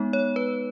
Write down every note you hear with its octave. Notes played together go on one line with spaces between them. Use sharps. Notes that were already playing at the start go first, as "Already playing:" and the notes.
Already playing: G#3 B3 D#4
C#5
B4